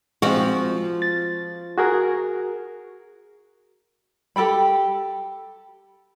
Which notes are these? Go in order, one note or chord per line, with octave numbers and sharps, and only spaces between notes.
F3 G#3 C4 F#4
A6
F#4 G#4 A#4
G4 A4 G5 B5